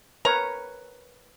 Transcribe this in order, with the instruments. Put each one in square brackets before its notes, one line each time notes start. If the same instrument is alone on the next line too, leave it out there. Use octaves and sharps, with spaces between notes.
[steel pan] A#4 B4 C#5 [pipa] A#5